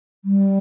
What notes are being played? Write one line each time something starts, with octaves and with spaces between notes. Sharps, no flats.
G3